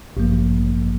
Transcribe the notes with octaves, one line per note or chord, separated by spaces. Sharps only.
A1 G2 F3 A#3